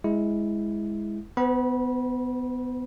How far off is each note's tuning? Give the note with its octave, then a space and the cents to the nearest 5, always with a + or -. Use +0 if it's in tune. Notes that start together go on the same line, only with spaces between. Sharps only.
G#3 +0 E4 -10
B3 +20 C5 -35 B5 -25